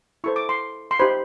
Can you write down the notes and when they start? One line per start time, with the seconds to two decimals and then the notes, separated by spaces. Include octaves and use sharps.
0.24 E4 A4 C5 C#6
0.36 D6
0.49 C6
0.91 C6
0.99 D#4 G4 C5 B5